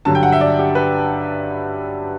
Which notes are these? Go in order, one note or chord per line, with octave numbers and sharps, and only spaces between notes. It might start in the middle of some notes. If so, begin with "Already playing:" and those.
G2 D3 F#3 A5
G5
F#5
E5
D5
G4
B4